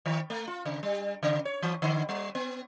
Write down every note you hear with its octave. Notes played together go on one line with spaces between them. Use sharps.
D#3
A3
F4
C#3
G3
C#3
C#5
E3
D3
G3
B3